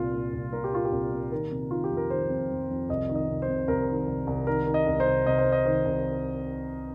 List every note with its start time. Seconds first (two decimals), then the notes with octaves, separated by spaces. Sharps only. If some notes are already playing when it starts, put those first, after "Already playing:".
Already playing: C2 A#2 F4
0.13 A#2
0.33 C2
0.52 A#2 A#4
0.64 G4
0.73 A#2 F4
0.85 G4
0.92 C2
1.11 A#2
1.31 D#3 A#4
1.51 C3
1.71 D#3 F4
1.84 G4
1.90 F2
1.97 A#4
2.10 D#3 C5
2.30 F2
2.51 F2
2.70 F2
2.89 C2 D#5
3.09 D#3
3.15 D#5
3.29 C2
3.42 C5
3.49 C3
3.68 C2 A#4
3.89 D#3
4.07 C2
4.27 C2
4.47 D#3 A#4
4.66 D#3
4.74 D#5
4.87 C2
5.00 C5
5.07 C2
5.27 C3 D#5
5.38 C5
5.46 C3
5.52 D#5
5.65 D#3 C5
5.85 C2